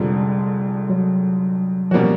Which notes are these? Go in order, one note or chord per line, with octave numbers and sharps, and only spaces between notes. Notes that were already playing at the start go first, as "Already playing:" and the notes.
Already playing: F1 F2 D3 F3 G3 G#3
F#3
B2 F3 G3 A#3 C#4 F#4